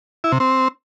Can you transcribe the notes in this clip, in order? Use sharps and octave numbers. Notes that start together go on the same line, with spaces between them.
E4
C3
C4